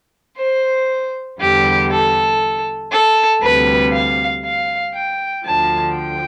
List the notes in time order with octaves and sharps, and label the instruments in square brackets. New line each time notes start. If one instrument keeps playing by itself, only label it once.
[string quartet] C5
E2 D3 G3 G4
A4
A4
D2 C3 G3 B4
F5
F5
G5
D2 D3 F3 A5
G5